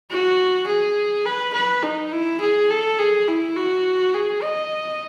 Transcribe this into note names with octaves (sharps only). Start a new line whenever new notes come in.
F#4
G#4
B4
B4
D#4
E4
G#4
A4
G#4
E4
F#4
G#4
D#5